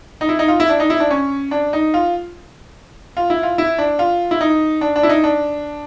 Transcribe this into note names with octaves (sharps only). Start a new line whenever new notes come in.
D#4
E4
D#4
F4
E4
D4
D#4
E4
D4
C#4
D4
D#4
F4
F4
E4
F4
E4
D4
F4
E4
D#4
D4
D4
E4
D#4
D4